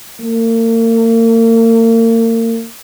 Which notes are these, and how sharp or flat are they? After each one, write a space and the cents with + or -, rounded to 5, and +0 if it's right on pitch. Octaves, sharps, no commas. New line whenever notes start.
A#3 -40